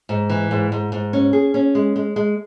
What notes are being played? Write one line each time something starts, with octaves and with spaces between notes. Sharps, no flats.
G#2
E3
G#2
G#2
G#2
C#4
G#4
C#4
G#3
G#3
G#3